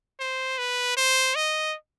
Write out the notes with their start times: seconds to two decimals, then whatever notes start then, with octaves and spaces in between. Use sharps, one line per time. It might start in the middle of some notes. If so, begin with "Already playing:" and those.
0.20 C5
0.58 B4
0.97 C5
1.35 D#5